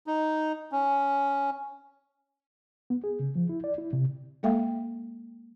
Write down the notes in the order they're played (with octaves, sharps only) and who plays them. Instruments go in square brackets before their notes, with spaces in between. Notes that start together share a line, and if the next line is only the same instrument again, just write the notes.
[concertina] D#4
C#4
[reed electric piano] B3
G#4
C#3
F3
E4
D5
E4
C3
[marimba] G#3 A#3 A4 E5 F5 G5